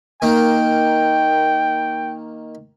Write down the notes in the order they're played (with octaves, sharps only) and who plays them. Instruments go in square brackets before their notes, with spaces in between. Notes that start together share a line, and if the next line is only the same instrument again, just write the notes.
[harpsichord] D#3 A#3 [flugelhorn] G5